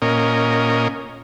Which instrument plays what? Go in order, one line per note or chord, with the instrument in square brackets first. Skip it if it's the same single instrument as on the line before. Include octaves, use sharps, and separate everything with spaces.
[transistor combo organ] A#2 C#4 A#4 D#5